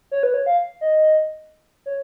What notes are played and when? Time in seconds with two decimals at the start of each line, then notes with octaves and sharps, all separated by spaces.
0.11 C#5
0.23 B4
0.34 C#5
0.46 F5
0.81 D#5
1.86 C#5